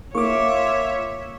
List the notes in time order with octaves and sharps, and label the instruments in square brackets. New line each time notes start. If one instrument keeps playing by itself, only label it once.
[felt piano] A#3 [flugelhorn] F4 [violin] C#5 E5 [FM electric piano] C#6 D6